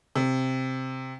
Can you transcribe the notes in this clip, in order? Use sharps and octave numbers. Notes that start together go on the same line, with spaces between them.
C3